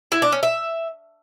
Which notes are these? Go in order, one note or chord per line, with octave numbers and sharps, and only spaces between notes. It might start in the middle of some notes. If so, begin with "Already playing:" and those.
E4
D4
C#4
E5